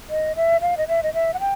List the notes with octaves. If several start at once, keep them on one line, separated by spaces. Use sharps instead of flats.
D#5
E5
F5
D#5
E5
D#5
E5
F#5
G5